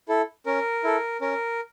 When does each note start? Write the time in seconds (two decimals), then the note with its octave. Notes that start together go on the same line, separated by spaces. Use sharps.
0.09 E4 A4
0.46 C#4 A#4
0.84 E4 A4
1.21 C#4 A#4